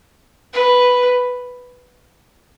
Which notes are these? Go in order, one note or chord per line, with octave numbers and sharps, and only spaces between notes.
B4